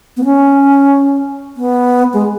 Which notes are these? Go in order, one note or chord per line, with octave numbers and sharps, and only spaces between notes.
B3
C#4
B3
G#3